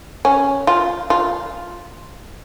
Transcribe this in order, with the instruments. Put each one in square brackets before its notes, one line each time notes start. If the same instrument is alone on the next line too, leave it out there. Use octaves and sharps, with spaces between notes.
[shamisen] C#4
F4
F4